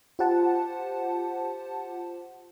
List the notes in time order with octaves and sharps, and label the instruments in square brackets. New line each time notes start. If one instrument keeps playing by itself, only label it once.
[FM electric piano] F4 G4 C5 F#5 A5